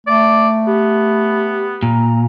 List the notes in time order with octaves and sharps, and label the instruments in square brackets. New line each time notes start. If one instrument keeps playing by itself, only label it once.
[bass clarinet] A3 [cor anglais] D5
[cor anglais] B3 [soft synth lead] G4
[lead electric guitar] A#2 [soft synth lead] A#5